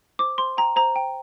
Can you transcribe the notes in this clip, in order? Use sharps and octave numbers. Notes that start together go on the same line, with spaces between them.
C5 D6
C5 C6
G5 A#5
C5 A#5
G5